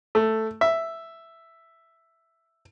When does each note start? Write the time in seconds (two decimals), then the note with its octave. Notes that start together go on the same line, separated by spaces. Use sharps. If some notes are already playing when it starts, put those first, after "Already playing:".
0.15 A3
0.61 E5